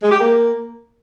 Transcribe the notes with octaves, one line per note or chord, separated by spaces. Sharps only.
G#3
G4
A#3